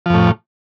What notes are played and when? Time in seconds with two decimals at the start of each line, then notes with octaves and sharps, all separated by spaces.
0.06 F3
0.10 F2
0.14 A2